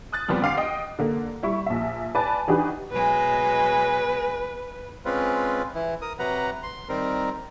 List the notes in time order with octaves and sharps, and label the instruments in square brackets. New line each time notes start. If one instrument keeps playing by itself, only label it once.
[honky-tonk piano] D#6 F#6 A6
A#2 F3 G3 B3 C4
D2 G4 F5 D6 C7
D#5 G5 D#6
D3 A#3
G3 E4 C#6
A#1 E5
B4 D5 G#5 A5 B5
E3 D4 D#4 F#4 G4 B4
[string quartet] B2 F#3 G#3 [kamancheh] B4
[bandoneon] G#3 C4 C#4 F4 B4
E3 E4
A#4 D#6
C3 F#3 B4 F#5 A#5
C6
D#3 G3 C4 A#4